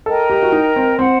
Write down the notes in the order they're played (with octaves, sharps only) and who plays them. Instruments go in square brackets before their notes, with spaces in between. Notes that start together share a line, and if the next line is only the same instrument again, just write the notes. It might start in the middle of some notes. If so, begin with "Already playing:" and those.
[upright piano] A4 [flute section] A#4 D#5 G5 A#5
[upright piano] G4
F#4
D#4
C4
[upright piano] C4 [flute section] C5 F#5 C6